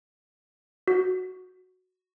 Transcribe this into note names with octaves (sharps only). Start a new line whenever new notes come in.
F#4